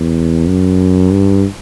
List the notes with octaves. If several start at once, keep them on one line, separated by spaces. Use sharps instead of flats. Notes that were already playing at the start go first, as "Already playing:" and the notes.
Already playing: E2
F#2
G2